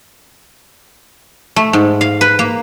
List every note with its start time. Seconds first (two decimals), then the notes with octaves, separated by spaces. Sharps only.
1.56 A3
1.73 G#2
2.01 F5
2.21 B4
2.39 A#3